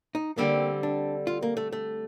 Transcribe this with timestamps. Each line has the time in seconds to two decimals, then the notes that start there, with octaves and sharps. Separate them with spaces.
0.15 D#4
0.38 D3 G3 A#3 C4
0.83 D4
1.27 F4
1.43 A#3
1.57 A3
1.72 A3